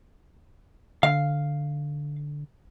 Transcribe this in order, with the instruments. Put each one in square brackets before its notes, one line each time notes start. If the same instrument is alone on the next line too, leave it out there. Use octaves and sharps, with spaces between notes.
[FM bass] D3 [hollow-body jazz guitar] F5